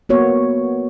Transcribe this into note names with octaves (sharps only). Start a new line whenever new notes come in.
A#3 B3 F#4 C#5